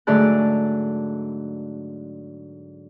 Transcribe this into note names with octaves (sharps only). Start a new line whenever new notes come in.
G#2 D3 F#3 A3 D5 F#6